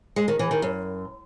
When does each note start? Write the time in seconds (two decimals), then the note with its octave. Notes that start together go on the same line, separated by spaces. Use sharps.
0.16 G#3
0.28 D#3
0.39 E3
0.51 D#3
0.62 F#2